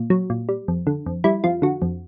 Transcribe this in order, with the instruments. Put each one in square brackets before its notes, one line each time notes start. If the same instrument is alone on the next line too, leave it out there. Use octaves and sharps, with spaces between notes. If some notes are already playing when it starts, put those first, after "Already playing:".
Already playing: [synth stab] A#2
F#3
A#2
G3
F2
D3
F2
G3 E4
F2 F4
D3 F#4
F2